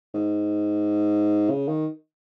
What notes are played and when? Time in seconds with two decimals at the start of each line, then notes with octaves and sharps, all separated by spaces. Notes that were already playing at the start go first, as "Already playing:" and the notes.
0.14 G#2
1.51 C#3
1.68 D#3